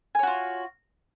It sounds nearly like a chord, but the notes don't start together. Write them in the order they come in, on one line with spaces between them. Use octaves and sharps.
G#5 C#5 F#4 F4